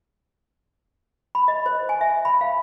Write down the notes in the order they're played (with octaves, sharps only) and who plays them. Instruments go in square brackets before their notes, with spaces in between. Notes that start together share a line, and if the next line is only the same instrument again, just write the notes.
[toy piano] B5
D#5
C5
G#5
E5
B5
F5